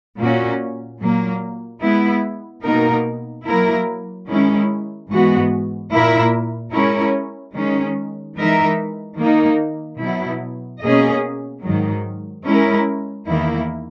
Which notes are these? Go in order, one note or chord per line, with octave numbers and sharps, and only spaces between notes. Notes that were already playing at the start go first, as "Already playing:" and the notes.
A#2 A#3 C#4 F#4
A#2 F#3 A#3
G#3 B3 E4
B2 A#3 D#4 A#4
F#3 A#3 E4 A#4
D#3 G#3 C#4 E4
G#2 E3 G#3 B3 F#4
A#2 A#3 E4 A#4 E5
G#3 C#4 E4 A#4 C#5
D#3 G#3 C#4
E3 G#3 D#4 A#4 E5
D#3 A#3 D#4
B2 F#3 B3 E4
B2 A#3 C#4 G#4 D#5
G#2 D#3 F#3
G#3 C#4 E4 A#4
E2 D#3 A#3 E4